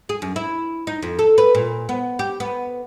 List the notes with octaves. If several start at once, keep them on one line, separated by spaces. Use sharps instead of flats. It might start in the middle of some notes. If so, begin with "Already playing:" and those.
G#4
F#2
E4
D#4
F2
A4
B4
A#2
B3
G4
B3